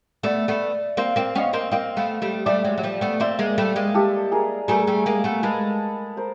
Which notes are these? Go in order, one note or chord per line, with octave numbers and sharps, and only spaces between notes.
A3 B3 D5 E5
A3 B3
A#3 C4 F5
A#3 C4 F5
B3 C#4 D#5 F5
A#3 C4
A#3 C4 D#5 F5
A3 B3
G3 A3
G3 A3 D5 E5
F#3 G#3
F#3
F3 G3
A3 B3
A#3 C4 D5 E5
G#3 A#3
G3 A3
G#3 A#3
G4 A4
G#4 A#4
G3 A3 G#4 A#4
G3 A3
G#3 A#3
A3 B3
G#3 A#3 A4 B4
A#4 C5